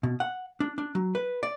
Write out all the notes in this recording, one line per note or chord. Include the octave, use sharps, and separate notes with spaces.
B2
F#5
D4
D4
F#3
B4
D5